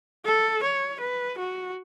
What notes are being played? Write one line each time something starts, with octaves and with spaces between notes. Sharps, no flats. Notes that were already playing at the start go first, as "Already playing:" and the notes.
A4
C#5
B4
F#4